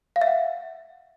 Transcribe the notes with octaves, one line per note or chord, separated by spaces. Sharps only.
F5
E5
F#5